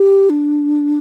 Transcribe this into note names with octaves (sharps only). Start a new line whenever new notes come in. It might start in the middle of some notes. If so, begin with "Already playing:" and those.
Already playing: G4
D4